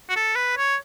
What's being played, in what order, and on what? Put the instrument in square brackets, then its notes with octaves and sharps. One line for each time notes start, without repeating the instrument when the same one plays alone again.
[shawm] F#4
A4
B4
C#5